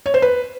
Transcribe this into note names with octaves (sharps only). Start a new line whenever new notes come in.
C#5
C5
B4